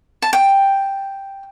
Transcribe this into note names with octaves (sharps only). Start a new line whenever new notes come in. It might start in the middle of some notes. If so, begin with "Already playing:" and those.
A5
G5